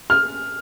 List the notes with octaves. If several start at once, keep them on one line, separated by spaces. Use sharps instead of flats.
F6